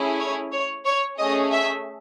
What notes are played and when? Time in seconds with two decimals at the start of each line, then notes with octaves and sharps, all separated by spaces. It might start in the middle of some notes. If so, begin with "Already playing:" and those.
Already playing: A3 C#4 E4 G#4
0.19 C#5
0.52 C#5
0.85 C#5
1.19 A3 C#4 G#4 D#5
1.52 E5